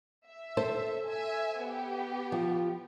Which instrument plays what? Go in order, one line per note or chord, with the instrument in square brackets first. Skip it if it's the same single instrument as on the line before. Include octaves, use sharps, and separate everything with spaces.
[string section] E5
[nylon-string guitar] A4 C5
[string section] E5 G#5
B3 G4
[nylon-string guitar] F3